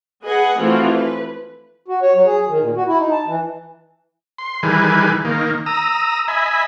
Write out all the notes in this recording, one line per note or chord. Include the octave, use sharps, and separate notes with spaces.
G#4 B4 D#5 F#5 G#5
E3 F3 A3 C4 F4 F#4
B4
F#4
C#5
F#3
G#4
D#3
A#2
F#4
E4
D#4
A5
E3
C6
D#3 E3 G3 G#4 B4
D#3 A#3
A#5 D#6 E6
D#5 E5 G#5 B5